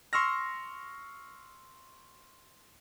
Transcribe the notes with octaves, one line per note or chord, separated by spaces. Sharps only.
C6 C#6 E6 F6 A#6